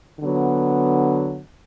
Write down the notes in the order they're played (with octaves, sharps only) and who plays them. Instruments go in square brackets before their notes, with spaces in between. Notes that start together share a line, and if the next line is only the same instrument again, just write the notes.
[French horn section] D3 F#3 B3